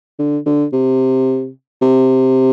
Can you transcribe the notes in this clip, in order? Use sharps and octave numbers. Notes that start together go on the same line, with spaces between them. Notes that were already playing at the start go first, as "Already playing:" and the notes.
D3
D3
C3
C3